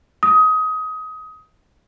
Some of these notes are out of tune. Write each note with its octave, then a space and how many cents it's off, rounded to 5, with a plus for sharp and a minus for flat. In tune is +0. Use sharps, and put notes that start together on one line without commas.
D#6 +20